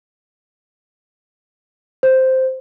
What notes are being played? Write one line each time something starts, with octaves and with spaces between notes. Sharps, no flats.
C5